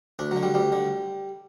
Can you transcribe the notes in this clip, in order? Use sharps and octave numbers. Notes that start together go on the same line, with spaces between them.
D2 D4
D3 F#3
G3
D2 G3
D3